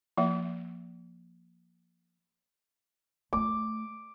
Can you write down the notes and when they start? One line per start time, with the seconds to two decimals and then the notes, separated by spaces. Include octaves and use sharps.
0.17 F3 A#3 E5
3.33 A3 F4 D6